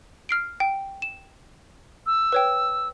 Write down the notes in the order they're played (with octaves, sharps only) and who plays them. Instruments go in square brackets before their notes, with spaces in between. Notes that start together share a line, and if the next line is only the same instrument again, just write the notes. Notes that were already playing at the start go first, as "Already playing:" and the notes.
[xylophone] F6 C7 D7
G5
E7
[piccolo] E6
[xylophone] B4 C#5 G5